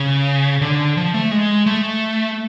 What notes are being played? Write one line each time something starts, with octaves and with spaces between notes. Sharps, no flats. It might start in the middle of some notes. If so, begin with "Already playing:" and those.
Already playing: C#3
D3
F3
A3
G#3
A3